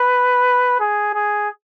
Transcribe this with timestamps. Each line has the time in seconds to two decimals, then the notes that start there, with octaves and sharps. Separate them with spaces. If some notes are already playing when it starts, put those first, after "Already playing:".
Already playing: B4
0.80 G#4
1.14 G#4